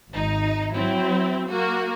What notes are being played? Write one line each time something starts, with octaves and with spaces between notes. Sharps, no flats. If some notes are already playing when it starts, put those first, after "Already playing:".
G#1 D#4
F#3 C4 E4
A#3 F#4